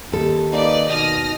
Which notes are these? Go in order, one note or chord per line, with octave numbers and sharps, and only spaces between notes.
D#2 G4 A4
A#3 D#4 B4 D5
B2 D#4 D#6 F6 A#6